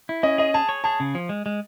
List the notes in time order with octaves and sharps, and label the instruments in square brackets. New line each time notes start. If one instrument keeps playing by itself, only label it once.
[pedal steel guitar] E4
[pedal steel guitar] C#4 [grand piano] D#5
[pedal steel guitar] G#4 [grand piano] D#5
[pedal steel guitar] G#4 [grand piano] A5
[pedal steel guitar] C#5
[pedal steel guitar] G#4 [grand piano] A5
[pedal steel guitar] C#3
F3
G#3
G#3